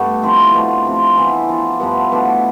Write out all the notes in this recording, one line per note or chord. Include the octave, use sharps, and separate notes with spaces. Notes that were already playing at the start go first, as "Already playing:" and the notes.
Already playing: G2 A3 B3 D4
F3 C4 E4
B2 A3 D4 F4
C3 F3 C4
E3 B3 E4
F3 B3 D4
G2 F3 B3 E4
B2 A3 D4